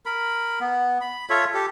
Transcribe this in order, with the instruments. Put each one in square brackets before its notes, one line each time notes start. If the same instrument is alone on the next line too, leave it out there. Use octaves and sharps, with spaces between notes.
[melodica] A#4 B5
B3
B5
F4 A4 C#5 E5
G4 A4